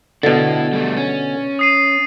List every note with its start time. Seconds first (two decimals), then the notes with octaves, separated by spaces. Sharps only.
0.23 B2 D3 E4 A4 A6
0.73 G3 A3
0.97 C#4
1.59 D#6 C7 D#7